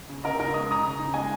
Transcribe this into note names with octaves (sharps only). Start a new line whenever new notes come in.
C#3
C#3 A#4 D#5
D#4 A#4 D#5
G#3 D#6
C#3 A#5 D#6
C#3
D#4
G#3 D#5 G#5